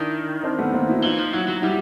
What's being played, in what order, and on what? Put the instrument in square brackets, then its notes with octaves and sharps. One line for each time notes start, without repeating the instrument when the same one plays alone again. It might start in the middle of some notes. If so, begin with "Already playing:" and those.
Already playing: [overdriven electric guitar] D#3 [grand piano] D4 E4
[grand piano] C4 D4
A3 B3
A#3 C4
E4 F#4
[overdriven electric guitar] E3 [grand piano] D#4 F4
[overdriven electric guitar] F3
[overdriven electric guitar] F#3 [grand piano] E4 F#4
[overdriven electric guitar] F#3
[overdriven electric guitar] G3 [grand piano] E4 F#4